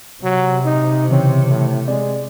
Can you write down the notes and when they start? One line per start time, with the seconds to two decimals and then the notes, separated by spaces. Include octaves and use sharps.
0.23 C3 F#3
0.65 D#4
1.09 C#3 E3 C4 C#5
1.48 A2
1.88 G#3 C4 D5